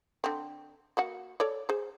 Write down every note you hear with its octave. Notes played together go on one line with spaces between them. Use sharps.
D3 C4
A#3 F#4 F#5
A4 C#5 D5
G#4 C5